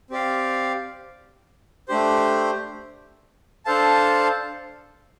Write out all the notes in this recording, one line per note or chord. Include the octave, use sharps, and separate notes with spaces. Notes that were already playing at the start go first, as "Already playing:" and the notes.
C4 G4 D5 F5
A3 D4 G4 C5
D4 A4 C5 F5 A5